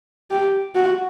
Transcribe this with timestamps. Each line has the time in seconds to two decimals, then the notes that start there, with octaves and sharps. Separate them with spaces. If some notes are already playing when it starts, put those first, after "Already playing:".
0.31 G4
0.75 F#4